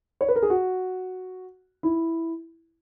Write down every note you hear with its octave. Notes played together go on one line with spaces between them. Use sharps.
C#5
B4
A#4
G#4
F#4
E4